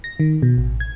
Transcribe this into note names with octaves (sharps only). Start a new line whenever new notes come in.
A#6
D#3
B2
A1
G#6